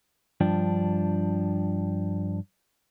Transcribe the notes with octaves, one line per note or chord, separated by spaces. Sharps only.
G2 F3 D4